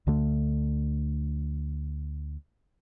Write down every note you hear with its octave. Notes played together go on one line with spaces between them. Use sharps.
D2 D3 A3